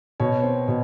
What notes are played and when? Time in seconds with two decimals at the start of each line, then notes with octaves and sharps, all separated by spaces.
0.20 B2 C#5
0.43 C4
0.68 B2